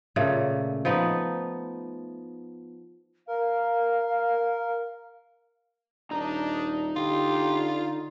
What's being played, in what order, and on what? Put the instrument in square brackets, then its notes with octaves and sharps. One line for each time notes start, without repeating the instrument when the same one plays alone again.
[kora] A#2 C#3 A3
F3 B3 D#4
[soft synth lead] A#4 [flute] F5
[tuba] D#1 [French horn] D4 [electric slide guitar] D#4 A#5
[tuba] D3 [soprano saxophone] F4 [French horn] G4